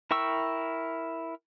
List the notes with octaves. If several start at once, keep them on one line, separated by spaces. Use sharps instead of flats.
E4 A#4 G5 C#6 E6